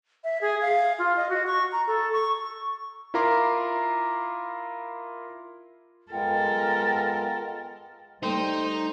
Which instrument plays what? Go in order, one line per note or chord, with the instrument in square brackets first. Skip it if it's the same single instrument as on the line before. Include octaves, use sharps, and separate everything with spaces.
[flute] E5
G#4
F5
F4
D#5
F#4
C#6
A#5
A4
C#6
[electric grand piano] E4 F4 A#4 A#5 C6 D6
[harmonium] G#3 B3 F4 [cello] A4 A#4 [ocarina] G5
[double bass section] G3 [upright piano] A3 G5 [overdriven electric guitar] D#4 [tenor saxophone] C5